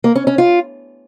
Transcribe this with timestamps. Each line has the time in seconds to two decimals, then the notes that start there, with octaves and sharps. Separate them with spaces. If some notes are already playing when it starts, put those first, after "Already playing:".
0.04 A#3
0.16 C#4
0.27 C#4
0.38 F4